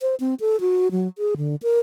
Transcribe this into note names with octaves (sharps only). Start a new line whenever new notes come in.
C5
C4
A4
F#4
F#3
G#4
D3
A#4